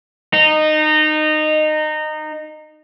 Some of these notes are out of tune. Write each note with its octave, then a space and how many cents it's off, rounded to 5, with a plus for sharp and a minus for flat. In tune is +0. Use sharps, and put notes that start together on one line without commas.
D#4 -20